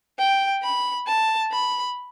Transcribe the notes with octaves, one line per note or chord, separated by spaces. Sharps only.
G5
B5
A5
B5